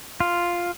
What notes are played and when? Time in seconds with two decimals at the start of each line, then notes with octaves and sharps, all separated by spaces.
0.20 F4